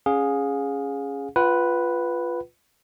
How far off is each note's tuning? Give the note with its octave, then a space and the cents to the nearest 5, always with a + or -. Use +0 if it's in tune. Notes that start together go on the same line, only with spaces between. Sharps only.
C#4 +0 G#4 -5 F5 +35
F4 +0 B4 +0 F#5 +40